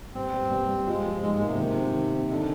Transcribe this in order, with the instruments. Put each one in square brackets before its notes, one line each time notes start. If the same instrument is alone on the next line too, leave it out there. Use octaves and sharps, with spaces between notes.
[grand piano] G2 [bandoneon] C4
[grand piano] G2
G2
G2
[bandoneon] G#3 [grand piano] F4
[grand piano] F3
[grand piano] G#2 [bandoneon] G#3
[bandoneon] G#3
[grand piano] A#3
[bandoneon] C3
[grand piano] D#3
C4
D#3
C4
[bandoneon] D3 [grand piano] D#4